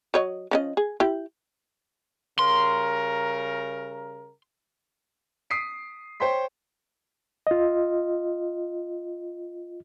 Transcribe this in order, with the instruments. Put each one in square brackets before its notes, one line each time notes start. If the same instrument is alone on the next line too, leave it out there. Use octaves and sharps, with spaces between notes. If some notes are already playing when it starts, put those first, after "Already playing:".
[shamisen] F#3 C#5 D#5
F3 C#4 D#5
G#4
E4 G4
[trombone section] C#3 G3 A#4 [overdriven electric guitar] C6
[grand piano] D#6 B6 C7 D7
C5 C#5 G5 C6 B6
[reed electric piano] F4 D#5